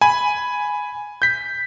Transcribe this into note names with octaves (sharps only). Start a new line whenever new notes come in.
G#5 B5
G6 B6